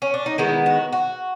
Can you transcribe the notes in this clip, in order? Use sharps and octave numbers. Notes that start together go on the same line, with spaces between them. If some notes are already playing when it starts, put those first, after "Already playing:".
C#4
D4
D#4
D#3 G#3 B3 E4
F#4
F#4